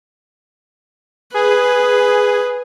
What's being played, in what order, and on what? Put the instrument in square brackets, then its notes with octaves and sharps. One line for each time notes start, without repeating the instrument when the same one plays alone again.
[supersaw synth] G#4 [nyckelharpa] B4